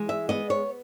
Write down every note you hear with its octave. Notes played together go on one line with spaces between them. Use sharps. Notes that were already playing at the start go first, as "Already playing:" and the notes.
Already playing: E3 G#3
E5
B3 D#5
C#5